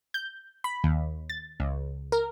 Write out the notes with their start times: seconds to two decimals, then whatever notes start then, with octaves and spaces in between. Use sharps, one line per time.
0.14 G6
0.64 B5
0.84 D#2
1.30 A6
1.60 C#2
2.12 A#4